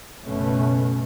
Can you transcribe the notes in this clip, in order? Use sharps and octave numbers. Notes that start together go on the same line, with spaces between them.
F#1 B2 A3 C#4